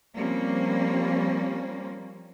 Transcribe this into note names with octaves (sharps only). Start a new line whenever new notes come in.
F3 G3 A#3 C4 C#4